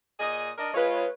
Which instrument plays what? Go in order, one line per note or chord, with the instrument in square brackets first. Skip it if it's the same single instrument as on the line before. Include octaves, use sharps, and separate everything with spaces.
[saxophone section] A#2 G#4 D#5
D4 A#4 D#5
[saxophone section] G#3 F4 [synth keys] B4 C#5